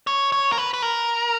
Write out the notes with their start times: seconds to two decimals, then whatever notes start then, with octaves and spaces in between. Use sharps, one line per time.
0.07 C#5
0.32 C#5
0.52 A#4
0.58 B4
0.74 B4
0.82 A#4